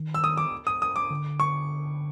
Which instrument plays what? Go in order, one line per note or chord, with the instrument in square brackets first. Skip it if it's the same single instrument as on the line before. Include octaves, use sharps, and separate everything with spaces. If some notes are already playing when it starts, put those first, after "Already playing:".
Already playing: [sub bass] D#3
[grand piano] E6
D#6
D6
D#6
D#6
D6
[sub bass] D3
[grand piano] C#6